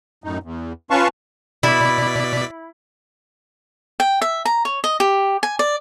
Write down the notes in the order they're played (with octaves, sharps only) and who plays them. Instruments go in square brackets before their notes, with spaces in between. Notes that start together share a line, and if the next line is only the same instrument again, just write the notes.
[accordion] F#2 A2 D#4
E2
C#4 F4 B4 F5 A5 C#6
[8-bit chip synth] B2 D5 B6 [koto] E4
[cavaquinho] G5
E5
A#5
C#5
D#5
G4
G#5
D5